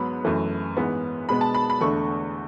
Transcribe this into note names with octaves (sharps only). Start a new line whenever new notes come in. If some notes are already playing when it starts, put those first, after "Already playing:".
Already playing: G#2 F#3 B3 B5
F#2 E3 A3
G#2 E3 B3
B2 G#3 B3 B5
A5
B5
B5
E2 D3 A3 C#6